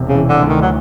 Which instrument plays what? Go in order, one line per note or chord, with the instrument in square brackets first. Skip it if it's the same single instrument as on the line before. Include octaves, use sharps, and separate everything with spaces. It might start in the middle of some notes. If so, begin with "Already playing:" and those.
Already playing: [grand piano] E1 C3
[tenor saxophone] C#3
[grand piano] E3
[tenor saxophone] D3
[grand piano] D2
[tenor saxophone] D#3
F#3